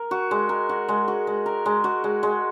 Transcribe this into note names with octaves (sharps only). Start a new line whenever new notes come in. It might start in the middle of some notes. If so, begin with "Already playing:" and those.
Already playing: A#4
F#4
G#3
A#4
F#4
G#3
F#4
G#3
A#4
G#3
F#4
G#3
G#3